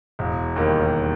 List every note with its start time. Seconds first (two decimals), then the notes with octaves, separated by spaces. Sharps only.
0.19 E1
0.56 D#2 D#3 G3